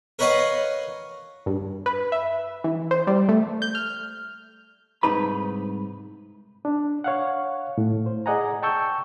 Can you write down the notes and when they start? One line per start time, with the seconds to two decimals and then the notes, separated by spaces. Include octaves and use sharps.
0.19 A#4 B4 C#5 D#5 F5 F#5
1.46 G2
1.86 B4
2.12 E5
2.64 E3
2.91 C5
3.07 G3
3.29 A3
3.62 G6
3.75 F6
5.03 C2 G#2 D#4 B4 B5
6.65 D4
7.04 C#5 F5 F#5
7.78 A2
8.06 C5
8.26 G#4 D5 D#5 F#5 G#5 A#5
8.63 G5 A5 C#6 E6 G6